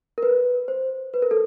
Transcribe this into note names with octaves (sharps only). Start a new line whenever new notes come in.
A#4
B4
C5
B4
A#4
A4